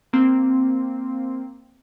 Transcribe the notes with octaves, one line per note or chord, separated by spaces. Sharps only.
A#3 C4